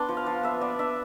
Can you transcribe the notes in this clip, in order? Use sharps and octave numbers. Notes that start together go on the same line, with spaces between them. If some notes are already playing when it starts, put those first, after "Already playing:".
Already playing: B3 D4 C6 D6
F3
F5
F3
B3 E5
B3 D5
D4 E5